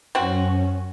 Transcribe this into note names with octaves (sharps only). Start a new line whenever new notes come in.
F#2 C4 C#4 F#4